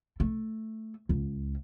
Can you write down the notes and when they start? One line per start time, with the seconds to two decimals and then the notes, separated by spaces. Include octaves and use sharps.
0.20 A3
1.09 C#2